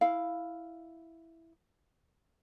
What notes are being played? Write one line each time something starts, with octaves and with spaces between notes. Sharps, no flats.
E4 F5